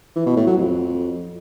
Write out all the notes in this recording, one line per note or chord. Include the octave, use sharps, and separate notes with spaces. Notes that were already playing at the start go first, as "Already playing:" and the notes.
E3
B2
A2
F#3
F2